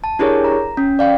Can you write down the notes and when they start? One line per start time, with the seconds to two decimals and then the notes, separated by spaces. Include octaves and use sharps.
0.04 A5
0.19 D4 E4 G4 G#4 A#4 C#5
0.44 A#5
0.77 C#4
0.99 D5 F5 G5